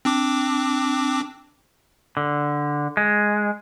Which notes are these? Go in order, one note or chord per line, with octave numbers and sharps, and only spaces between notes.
C4 D4 D6
D3
G#3